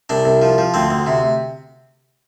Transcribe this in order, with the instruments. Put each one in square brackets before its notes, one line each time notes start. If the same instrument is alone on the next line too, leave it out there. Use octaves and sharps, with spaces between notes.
[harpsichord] C2 D4
C2
F3
F3
D2 C4
D2
C3